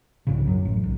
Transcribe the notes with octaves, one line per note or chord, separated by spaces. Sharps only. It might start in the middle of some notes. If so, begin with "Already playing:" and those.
C2 G#2 C#3
F#2 F#3
A1
B1